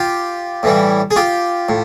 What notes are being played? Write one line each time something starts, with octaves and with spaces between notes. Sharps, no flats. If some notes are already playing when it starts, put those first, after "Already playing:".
Already playing: F4 G4
A2 E3 G3
G#4
F4 G4
A2